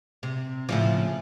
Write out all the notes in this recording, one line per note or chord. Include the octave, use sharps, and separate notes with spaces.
C3
A2 C#3 F3